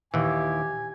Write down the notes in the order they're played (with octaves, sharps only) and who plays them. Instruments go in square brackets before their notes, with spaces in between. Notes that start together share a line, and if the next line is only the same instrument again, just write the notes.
[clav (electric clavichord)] D#2 E3 [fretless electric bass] A#2 D#3 [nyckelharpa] G4 [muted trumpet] G#5